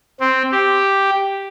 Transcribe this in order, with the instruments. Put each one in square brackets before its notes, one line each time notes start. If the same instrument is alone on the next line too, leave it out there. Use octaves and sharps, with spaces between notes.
[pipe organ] C4
G4